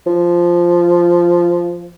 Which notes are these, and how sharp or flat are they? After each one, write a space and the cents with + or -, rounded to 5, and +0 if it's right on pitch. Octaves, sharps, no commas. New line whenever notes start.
F3 -5